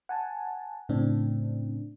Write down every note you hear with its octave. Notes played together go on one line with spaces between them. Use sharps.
F#5 G#5 A5
A2 C#3 C4 D4